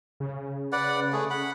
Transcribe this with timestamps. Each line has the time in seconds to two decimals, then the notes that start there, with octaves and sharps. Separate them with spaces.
0.20 C#3
0.72 B4 D5 F#5
1.13 A3 G#4
1.30 F#5 B5